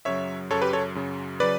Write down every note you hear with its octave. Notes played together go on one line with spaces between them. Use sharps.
F#2 C#3 F#3 C#5 E5
F#2 C#3 F#3 A4 C#5
G4 B4
A4 C#5
F#2 C#3 F#3
C#3 F#3 B4 D5